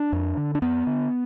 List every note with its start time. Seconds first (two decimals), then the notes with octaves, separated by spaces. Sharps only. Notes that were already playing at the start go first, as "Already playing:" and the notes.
Already playing: D4
0.12 F2
0.37 D3
0.55 D4
0.62 F2 B3
0.87 D3